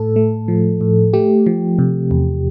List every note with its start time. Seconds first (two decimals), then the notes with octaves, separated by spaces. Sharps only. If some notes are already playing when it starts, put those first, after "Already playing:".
Already playing: A2 A4
0.16 A3
0.48 F3
0.81 A2
1.13 A3 G4
1.47 F3
1.79 C3
2.11 E2